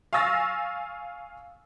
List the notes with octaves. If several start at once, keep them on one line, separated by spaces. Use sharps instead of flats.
F5 G#5 C#6 E6 A6 A#6